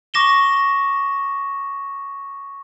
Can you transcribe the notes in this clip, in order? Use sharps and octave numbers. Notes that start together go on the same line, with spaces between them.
C#6 D6 A#6 E7 G7